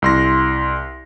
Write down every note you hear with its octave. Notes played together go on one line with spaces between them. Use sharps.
C2 C6 A#6